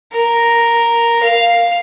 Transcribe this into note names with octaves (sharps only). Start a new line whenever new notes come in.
A#4
F5